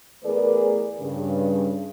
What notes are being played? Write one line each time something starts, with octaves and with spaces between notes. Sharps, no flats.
E2 A3 G#4 A#4 B4 D5
G2 C#3